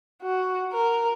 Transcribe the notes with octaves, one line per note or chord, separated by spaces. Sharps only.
F#4
A#4